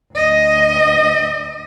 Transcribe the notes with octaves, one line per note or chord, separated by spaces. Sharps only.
D2 D#5